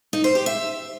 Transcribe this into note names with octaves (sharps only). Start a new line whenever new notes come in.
D#4
C5
G4
E5